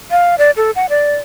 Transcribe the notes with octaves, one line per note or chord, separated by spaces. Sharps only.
F5
D5
A4
F#5
D5